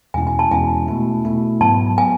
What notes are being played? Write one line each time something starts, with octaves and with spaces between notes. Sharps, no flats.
E2 B2 G#3 C#4 E4 G#5
G#5
A5
E2 B2 G#3 C#4 E4 G#5
B2 A3 E4
B2 A3 E4
G#2 F#3 B3 A5
F#3 B3 G#5